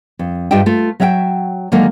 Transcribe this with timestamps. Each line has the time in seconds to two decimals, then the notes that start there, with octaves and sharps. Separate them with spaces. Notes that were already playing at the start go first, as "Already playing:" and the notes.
0.19 F2
0.51 G2 F4 G4 D#5 E5 G5
0.66 A3 F4
1.00 F#3 C#5 E5 F5 G5
1.72 D3 D#3 F#3 G#3 A#3 D#4